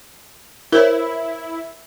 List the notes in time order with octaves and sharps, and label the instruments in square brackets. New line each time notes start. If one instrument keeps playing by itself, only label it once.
[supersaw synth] E4 [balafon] A#4 C5 C#5